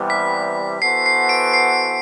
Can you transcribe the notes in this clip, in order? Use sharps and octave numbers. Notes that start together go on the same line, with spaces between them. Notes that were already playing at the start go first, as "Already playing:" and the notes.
Already playing: C3 E3 G3 B3
B6
E3 B3 F#4 A4 C5 C7
C7
D7
C7